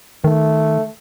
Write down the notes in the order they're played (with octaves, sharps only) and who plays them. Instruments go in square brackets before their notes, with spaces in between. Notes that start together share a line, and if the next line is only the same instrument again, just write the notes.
[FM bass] D#3 [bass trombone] A3